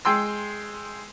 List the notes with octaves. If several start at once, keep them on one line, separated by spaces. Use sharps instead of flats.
G#3 G5 C6 E6